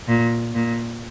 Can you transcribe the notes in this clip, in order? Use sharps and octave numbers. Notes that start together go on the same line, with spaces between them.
A#2
A#2